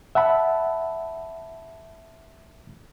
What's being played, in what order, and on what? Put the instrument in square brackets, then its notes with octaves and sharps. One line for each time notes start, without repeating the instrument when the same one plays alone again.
[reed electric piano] E5 F#5 A5 B5